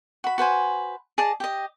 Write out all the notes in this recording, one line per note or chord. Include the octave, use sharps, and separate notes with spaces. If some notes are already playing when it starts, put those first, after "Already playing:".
F#4 B5
F#4 B4 C5 G#5
G#4 D5 D#5 A5
G4 D#5